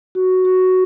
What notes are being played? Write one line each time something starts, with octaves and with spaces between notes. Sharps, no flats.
F#4
F#4